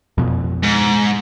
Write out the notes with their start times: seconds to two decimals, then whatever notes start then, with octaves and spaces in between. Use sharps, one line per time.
0.18 F2 B2
0.63 G#2